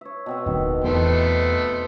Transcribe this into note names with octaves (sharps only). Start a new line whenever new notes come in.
C#5 E5
B2 C4 E5
D1 D#3
E2 A3 B3 C5 E5